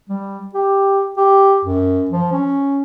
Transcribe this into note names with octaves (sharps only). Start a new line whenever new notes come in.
G3
G4
G4
F#2
F3
C#4